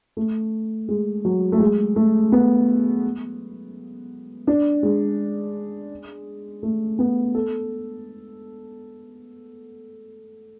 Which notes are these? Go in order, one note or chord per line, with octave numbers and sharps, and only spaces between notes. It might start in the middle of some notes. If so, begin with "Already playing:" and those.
A3
G#3
F#3
A3
G#3
A3
B3
D4
G#3
A3
B3
A4